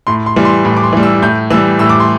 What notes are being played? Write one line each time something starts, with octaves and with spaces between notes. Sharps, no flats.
A2 C6
C6
E3 G3
C6
A2
D6
C6
E3 G3
E6
A2 G6
E3 G3 E6
A2 E6
D6
C6